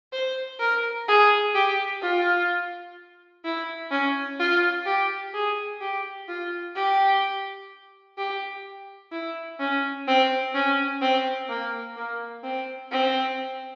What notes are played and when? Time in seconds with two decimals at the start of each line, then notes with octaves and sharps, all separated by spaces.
0.13 C5
0.60 A#4
1.08 G#4
1.55 G4
2.02 F4
3.45 E4
3.91 C#4
4.40 F4
4.86 G4
5.34 G#4
5.81 G4
6.29 F4
6.76 G4
8.18 G4
9.12 E4
9.60 C#4
10.08 C4
10.54 C#4
11.02 C4
11.49 A#3
11.97 A#3
12.44 C4
12.92 C4